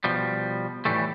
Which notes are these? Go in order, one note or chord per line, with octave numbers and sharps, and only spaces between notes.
B2 F3 G3
A2 E3 G3 A3